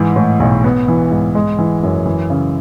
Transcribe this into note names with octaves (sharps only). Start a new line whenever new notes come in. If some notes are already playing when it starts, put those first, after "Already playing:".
Already playing: G#2 E3
A2
B1
B3
E3
G#2
G#3
E3
F#2
E3
C#3